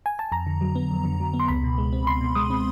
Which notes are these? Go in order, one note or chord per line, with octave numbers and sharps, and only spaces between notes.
G#5
A5
F2 A#5
D3
F#3
B3
F2
D3
F#3
B3
C6
C#2 B5
B2
G#3
C4
C#2 C6
B2
G#3 D#6
C4